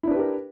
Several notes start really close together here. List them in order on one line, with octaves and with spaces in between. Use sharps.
E4 D4 B4 G4 A#4